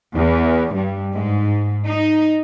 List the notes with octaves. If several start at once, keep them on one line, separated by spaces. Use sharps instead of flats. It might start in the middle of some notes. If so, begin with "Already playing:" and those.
E2
G2
G#2
D#4